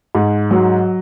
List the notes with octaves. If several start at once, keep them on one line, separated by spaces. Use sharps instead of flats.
G#2
F#3